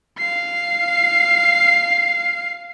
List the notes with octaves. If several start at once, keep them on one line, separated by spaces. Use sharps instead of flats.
F5 C7